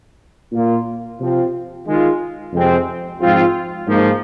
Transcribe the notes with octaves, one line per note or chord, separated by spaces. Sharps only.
A#2 A#3 F4
C3 F3 C4 F4
D#3 G#3 F4
F2 C3 G#3 C4
G#2 F3 C4 F4
G#2 F3 A#3